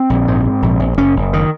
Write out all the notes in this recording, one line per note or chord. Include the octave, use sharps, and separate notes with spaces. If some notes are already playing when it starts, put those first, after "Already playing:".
Already playing: C4
A#1
G#2
G#2
A#1
A#1
F#1 C#4
F#1
D#3